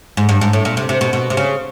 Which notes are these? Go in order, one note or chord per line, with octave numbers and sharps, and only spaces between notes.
G#2
G2
G#2
A2
A#2
C3
C3
B2
B2
C3
C#3